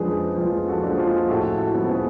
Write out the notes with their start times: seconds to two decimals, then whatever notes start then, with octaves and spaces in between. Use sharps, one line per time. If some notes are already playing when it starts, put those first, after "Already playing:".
Already playing: F2 F3 G#3 D4 G#4 B4
0.38 F2 F4 G#4
0.68 F#4 A4
0.83 F3 G#3 D4
0.98 F4 G#4
1.28 A2 F#4 A4
1.59 F#4 A4
1.75 F3 B3
1.89 G#4 B4